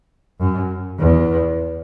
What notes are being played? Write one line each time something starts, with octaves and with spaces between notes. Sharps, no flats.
F#2
E2